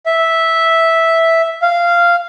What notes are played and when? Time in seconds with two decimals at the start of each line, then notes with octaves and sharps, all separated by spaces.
0.06 E5
1.62 F5